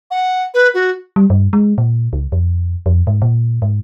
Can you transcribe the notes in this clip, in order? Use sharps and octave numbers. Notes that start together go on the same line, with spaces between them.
F#5
B4
F#4
G3
G2
G#3
A#2
C#2
F2
F2
G#2
A#2
G#2